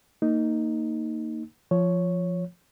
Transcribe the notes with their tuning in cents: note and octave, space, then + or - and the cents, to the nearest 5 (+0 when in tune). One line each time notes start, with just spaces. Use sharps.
A#3 -25 D#4 +0
F3 -5 C#5 +0